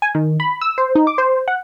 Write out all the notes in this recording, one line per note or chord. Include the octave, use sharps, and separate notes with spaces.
G#5
D#3
B5
E6
C5
D#4
D6
C5
F#5